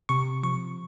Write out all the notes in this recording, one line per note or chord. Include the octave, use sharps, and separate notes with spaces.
C3 C#6
F3 C#6